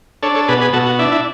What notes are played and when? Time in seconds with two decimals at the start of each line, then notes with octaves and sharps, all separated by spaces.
0.23 D4 A4 C#5
0.35 A4 C#5
0.48 B2 G#4 B4
0.61 G#4 B4
0.73 B2 F#4 A4
0.86 F#4
0.99 D4 E4
1.12 E4